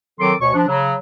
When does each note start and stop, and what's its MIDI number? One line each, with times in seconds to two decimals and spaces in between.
0.20 0.34 51
0.20 0.34 54
0.20 0.34 60
0.20 0.34 69
0.20 0.34 84
0.20 0.34 86
0.41 0.52 38
0.41 0.52 47
0.41 0.52 73
0.41 0.52 85
0.54 0.63 53
0.54 0.63 62
0.68 0.94 49
0.68 0.94 54